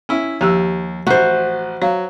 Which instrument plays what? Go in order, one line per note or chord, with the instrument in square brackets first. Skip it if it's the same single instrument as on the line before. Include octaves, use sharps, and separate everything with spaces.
[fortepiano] C#4 E4
[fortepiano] D#2 [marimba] F3 G4 E6
[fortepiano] A1 [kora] F#4 C5
[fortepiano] F#3 [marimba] C#5 F5